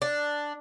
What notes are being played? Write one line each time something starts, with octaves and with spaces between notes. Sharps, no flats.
D4